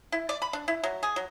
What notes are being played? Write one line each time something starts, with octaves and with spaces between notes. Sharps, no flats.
E4
D5
B5
D4
E4
F#3
G#4
F#3